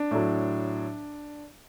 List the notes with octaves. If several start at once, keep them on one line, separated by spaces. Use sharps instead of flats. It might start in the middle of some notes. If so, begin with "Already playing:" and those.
Already playing: D4
A2 F#3